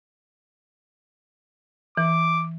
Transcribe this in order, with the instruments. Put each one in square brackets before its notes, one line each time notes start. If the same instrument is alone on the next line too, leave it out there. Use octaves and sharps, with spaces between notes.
[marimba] E3 [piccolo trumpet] D6